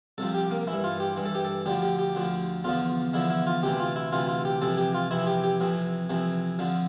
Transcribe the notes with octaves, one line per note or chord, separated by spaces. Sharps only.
C2 C3 F3 A4
G4
A#3
G2 E3 E4
F4
G4
G2 E3
A4
G4
A4
D2 D3 F3 G4
G4
G4
D2 D3 F3
E2 D3 F3 F4
E2 D3 F3 E4
E4
F4
D2 C3 E3 G4
F4
E4
D2 C3 E3 F4
F4
G4
F2 C3 E3 A4
G4
F4
F2 C3 E3 E4
G4
G4
F2 C3 E3
F2 C3 E3
F2 D3 F3